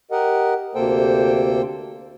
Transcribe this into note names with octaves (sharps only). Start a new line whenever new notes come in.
G4 A#4 D#5 F#5
D2 C3 A#3 A4 C5 G5